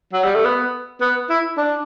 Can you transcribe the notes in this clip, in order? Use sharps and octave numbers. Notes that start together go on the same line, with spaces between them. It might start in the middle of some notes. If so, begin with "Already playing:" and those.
F#3
G3
A3
B3
B3
E4
D4